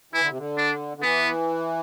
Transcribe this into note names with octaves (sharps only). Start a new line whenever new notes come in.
E3 E4
D3
C3
D3
D4
D3
E3 B3